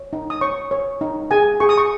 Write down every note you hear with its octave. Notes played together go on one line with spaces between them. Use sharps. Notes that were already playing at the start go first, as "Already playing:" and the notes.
Already playing: C#5
D#4
D#6
C#5 C#6
C#5
D#4
G#4 G#5
G#4 C#6
D#6
C#6